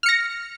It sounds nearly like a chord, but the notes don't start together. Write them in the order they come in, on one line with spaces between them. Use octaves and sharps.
F6 C#7 A#6